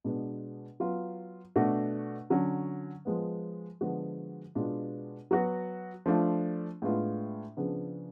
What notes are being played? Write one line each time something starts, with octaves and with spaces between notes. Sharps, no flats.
B2 G#3 B3 D4
F#3 B3 F4
B2 A3 D4 F#4
D3 F#3 C#4
F3 G#3 B3
D3 F3 G#3 B3 F#4
B2 G#3 B3 D4 F4
F#3 B3 F#4
F3 A3 D4 F4
A2 G#3 B3 D4 F4
C#3 F3 B3 D4